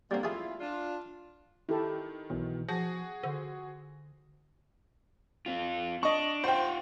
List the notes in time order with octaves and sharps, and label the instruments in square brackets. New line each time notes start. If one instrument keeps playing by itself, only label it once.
[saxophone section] D3 A#3 [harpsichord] G3 C4
[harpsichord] A3 G#4 [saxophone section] E4 F4
[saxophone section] D4 F4
[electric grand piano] D#3 [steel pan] E4 G4 A4
[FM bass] B1 [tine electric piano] B2 E3
[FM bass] F3 [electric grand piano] F#4 G#4 [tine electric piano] A#6
[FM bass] D3 [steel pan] C5
[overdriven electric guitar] C4 F4
[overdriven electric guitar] D4 [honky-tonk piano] D#5 C#6
[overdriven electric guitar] F4 F#5 [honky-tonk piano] C5 G5